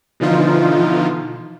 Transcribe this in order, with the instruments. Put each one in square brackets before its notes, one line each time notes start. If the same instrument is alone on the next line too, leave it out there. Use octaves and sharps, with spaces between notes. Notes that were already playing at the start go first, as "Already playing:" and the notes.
[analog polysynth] B2 D3 E3 F3 D#4 F4